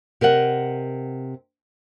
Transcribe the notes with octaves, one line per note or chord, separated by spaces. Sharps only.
C3 A#4 D#5 F#5